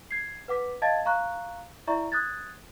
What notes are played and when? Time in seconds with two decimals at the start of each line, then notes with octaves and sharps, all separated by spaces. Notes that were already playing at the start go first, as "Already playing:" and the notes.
0.11 G#6 C7
0.48 B4 F#5 D6 B6
0.82 D#5 F5 A5 G#6 A6
1.05 F5 A#5 C#6 F#6
1.87 E4 D5 E5 A#5 C#6
2.12 D#6 F#6 G#6 A6